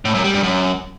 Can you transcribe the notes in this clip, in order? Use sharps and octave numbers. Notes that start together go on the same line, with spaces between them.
A2
F#2
G3
G2
F#2